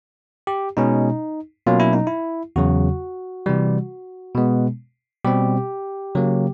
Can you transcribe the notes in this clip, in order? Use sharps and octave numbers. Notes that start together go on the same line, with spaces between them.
G4
B2 G#3 C#4 D#4
B2 F#3 A#3 C#4 F4
E4
D#4
E4
E2 C#3 F#3 F#4
C3 E3 G3
B2 G#3 B3
B2 G3 C4 G4
C#3 F#3 A#3